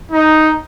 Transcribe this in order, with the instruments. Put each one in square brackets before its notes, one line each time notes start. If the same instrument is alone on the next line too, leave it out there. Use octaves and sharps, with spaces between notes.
[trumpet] D#4